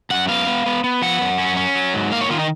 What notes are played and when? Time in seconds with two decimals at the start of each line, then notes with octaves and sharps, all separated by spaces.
0.10 F#2 F#5
0.29 B3 F5
0.47 B3
0.66 B3
0.84 B3
1.02 F3 F#5
1.21 F#2
1.38 C#4
1.57 C#4
1.76 F#3
1.94 G#2
2.11 A#3 F5
2.21 C#5
2.30 D#3 F4
2.39 D#4